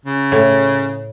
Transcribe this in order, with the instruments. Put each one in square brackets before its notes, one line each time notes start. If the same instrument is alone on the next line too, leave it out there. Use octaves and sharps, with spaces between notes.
[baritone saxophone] C#3
[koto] A2